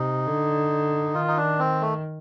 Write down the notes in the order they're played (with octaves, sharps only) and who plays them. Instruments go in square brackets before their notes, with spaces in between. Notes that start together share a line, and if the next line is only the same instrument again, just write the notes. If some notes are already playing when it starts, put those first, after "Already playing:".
Already playing: [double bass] C3 [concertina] D#4
[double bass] D3
[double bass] D#3 [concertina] F4
[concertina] D#4
D4
C4
A3